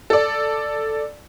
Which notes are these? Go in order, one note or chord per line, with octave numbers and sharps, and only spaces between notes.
A4 D5